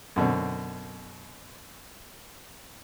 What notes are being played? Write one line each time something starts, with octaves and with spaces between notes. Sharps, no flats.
F#2 B2 D3 C4